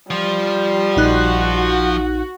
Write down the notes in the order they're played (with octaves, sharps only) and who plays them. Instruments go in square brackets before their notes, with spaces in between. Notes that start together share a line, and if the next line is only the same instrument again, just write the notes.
[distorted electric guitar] F3 F4 [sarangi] G3
[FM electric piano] A#1 D#4 F#6 [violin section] F#4